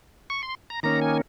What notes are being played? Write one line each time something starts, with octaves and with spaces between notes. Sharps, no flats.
C#6
C6
A#5
D#3 A#3 C#4 A#5
G#5